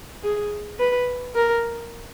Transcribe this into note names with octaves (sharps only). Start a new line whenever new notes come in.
G#4
B4
A#4